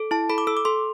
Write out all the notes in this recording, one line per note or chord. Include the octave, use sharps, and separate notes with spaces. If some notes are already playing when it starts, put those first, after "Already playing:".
Already playing: A4
E4 A5
A4 B5
D6
A4 E6
D6
A4 C6